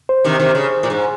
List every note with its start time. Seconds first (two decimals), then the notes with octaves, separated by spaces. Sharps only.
0.09 C5
0.24 C3 D#3
0.40 C3 D#3
0.55 C#3
0.83 A#2
0.90 G#2